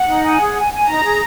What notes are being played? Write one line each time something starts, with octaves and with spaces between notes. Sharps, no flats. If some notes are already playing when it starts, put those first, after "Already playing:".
Already playing: F#5
D#4
G#5
G#4
G#5
G#5
D#4 A#5
G#4